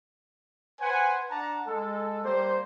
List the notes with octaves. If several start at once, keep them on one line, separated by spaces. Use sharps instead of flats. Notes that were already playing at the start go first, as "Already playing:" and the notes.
B4 C5 F#5 G#5
D4 D5 F#5 A5 A#5
G#3 A4
G3 A#3 C5